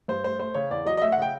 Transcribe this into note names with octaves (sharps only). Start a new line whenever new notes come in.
G2 C5
A3 C5
A3 C5
C#3 C#5
E2 D5
F#3 D#5
D#5
A3 E5
F#5
C#3 G5